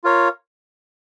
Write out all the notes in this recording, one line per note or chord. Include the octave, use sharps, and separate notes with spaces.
F4 A#4 C#5 F5